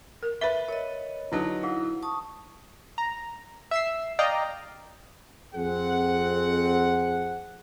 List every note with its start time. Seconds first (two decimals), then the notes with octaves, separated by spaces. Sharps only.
0.23 A#4
0.41 B4 E5 A6 G7
0.68 A#4 C#5 D#5
1.32 D3 F#3 D#4 E4 B4 A5
1.63 E4 G#4 F5 F#5
2.02 A5 C#6 D#6
2.98 A#5
3.71 E5 E6 C7
4.19 D5 D#5 F5 G5 A#5
5.55 F2 C4 G#4 F#5